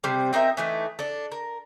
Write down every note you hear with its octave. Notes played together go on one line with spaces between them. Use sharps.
C3 G3 C4
C4 D#4 A#4 E5
E3 A3 D#4
D4 A4
A#4